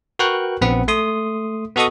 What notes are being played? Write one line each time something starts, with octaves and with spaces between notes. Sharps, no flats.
F#4 A#4 B4 G5 C#6 F#6
A#1 B3 C4 B4 F#5
A3 C6 D#6
B3 F#4 A4 D#5 C#6 D#6